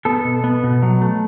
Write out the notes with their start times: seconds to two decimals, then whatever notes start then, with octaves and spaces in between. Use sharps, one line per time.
0.05 B3 A4
0.25 B2
0.44 B3
0.64 B2
0.83 F#3
1.02 A3